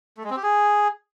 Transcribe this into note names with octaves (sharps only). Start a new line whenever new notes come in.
A3
G#3
C4
G4
G#4